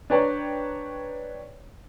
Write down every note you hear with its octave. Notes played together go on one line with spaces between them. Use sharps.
D4 B4 C#5 D5 G5 A#5